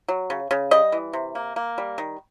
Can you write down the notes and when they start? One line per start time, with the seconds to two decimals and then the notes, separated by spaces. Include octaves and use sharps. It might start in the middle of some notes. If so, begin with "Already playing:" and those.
0.08 F#3
0.30 C#3
0.51 C#3
0.71 G3 D#5
0.92 E3
1.13 C3
1.35 A#3
1.56 A#3
1.78 G3
1.98 D#3